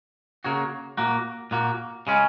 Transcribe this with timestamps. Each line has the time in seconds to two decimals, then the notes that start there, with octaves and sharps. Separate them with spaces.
0.44 C#3 A#3 F#4 C#5
0.97 A#2 A#3 F#4
1.51 A#2 A#3 F#4
2.07 C#3 G#3 C#4